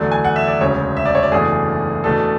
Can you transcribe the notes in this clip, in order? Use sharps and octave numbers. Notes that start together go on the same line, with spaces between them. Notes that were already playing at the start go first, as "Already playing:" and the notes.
Already playing: E2 D3 F#3 A3 D4
G#5
F#5
E5
D5
E1 D2 C#3 C#5
E5
D5
C#5
D5
F#1 E2 B2 A3 D4 G#4
E2 B2 A3 D4 A4